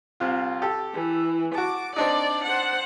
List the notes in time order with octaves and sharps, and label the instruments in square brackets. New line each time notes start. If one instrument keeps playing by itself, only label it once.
[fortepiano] C2 C3 F4
G4 A4
[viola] E3
[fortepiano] F#4 A5 [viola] D6
[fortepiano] C4 D4 D#4 [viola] D5
[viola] C5 F#5